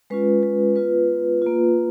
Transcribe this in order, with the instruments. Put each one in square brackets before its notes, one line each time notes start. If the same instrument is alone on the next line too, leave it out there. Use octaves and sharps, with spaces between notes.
[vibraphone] G#3 C#4 F4 B4
B4
B3 F4 B4
A#3 F4